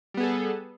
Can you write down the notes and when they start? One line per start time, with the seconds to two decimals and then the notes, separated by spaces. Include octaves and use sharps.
0.14 G3
0.17 B3
0.20 G#4
0.23 A4